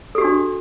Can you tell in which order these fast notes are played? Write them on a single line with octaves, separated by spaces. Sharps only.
A4 G4 F#4 D4